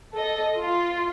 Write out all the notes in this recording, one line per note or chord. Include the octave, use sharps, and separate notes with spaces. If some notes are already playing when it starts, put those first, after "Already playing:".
A4 D#5
F4